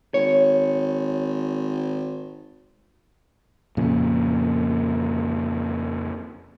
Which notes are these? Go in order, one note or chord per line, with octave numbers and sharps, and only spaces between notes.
G#1 C#5
F2 A#2 C#3